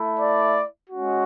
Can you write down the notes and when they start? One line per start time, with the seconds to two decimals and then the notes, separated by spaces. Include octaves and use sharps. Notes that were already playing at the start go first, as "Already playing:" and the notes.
Already playing: A3 E4
0.20 D5
0.90 G#3 C#4 F#4